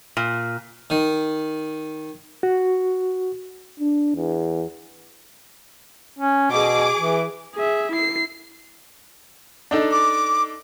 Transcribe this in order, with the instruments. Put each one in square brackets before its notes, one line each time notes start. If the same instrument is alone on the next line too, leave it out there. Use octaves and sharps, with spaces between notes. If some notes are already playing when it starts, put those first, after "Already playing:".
[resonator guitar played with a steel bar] A#2
[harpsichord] D#3
[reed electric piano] F#4
[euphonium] D4
E2
[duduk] C#4
[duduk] B2 [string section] G#4 D6
[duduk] E3
[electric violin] G#4 E5
E4 C7
[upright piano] D4 D#4 A4
[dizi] D6